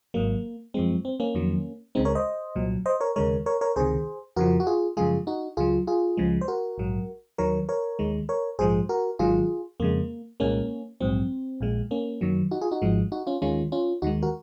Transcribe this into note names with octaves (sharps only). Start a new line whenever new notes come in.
G#1 G#2 F#3 A#3
F#2 F3 G#3 C4
C4
A#3 C#4
F2 D#3 F#3
C#2 C#3 G#3 C4 D#4
A#4 C#5
C5 D#5
C2 A#2 F#3
C5 D#5
A#4 C#5
D#2 C#3 G#3 A#4 C#5
A#4 C#5
A#4 C#5
C#2 C3 D#3 G#4 C5
F2 C#3 F3 F#4 A#4
F#4
F4 G#4
F#2 C#3 F3 G#3 F4 G#4
D#4 F#4
C#2 C#3 F#3 F4 G#4
F4 G#4
C#2 C#3 F3 G#3
C5
F#4 A#4
A#1 G#2 F#3
D#2 D#3 F#3 A#4 C#5
A#4 C#5
D#2 D#3 G#3
A#4 C#5
A#1 G#2 F3 G#3 G#4 C5
F#4 A#4
G#1 G#2 D#3 F#3 F4 G#4
F2 C#3 G#3 A#3
C2 A#2 G#3 A#3 C#4
A#1 G#2 F#3 C4
A#1 A#2 G#3
A#3 C#4
F#2 D#3 F#3
D#4 F#4
F4 G#4
D#4 F#4
G#1 G#2 F3 G#3
D#4 F#4
C#4 F4
D#2 D#3 G#3 C#4 F4
C#4 F4
D#2 D#3 G#3 D#4 F#4
F#4 A#4